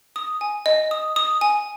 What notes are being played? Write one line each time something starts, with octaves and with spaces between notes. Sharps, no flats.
D#6
G#5
D#5
D#6
D#6
G#5